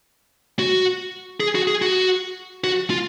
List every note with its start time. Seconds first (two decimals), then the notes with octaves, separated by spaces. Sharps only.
0.59 F#4
1.40 G#4
1.55 F#4
1.68 G#4
1.82 F#4
2.64 F#4
2.90 F4